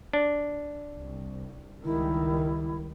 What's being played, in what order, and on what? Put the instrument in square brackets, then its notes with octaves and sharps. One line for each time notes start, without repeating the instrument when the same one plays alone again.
[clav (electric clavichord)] D4
[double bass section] C2
[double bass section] C#2 D#3 G3 [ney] E4